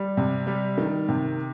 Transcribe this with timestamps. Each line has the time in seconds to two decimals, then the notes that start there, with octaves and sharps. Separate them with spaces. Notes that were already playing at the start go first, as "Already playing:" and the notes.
Already playing: G3
0.17 C3
0.47 G3
0.78 D#3
1.09 C3